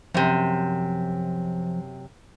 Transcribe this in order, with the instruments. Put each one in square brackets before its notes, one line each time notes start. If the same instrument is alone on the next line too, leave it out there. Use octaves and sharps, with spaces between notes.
[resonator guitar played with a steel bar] F#2 C3 [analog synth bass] F3